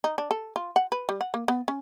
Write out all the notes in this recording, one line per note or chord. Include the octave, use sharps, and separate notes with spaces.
D#4
D4
A4
F4
F#5
B4
G3
F#5
A#3
B3
C#4